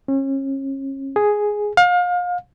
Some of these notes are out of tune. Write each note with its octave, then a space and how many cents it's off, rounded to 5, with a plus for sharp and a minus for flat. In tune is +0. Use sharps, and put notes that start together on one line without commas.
C#4 -35
G#4 +5
F5 +35